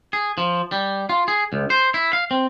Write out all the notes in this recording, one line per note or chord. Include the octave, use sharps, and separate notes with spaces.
G#4
F3
G3
F4
G#4
C#2
C5
E4
F5
C4